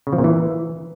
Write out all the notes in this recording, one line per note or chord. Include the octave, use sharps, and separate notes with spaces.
C#3
F3
A#2
E3